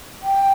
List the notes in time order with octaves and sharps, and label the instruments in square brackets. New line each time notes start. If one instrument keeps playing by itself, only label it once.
[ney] G5